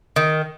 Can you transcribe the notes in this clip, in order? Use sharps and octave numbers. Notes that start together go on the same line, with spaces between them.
D#3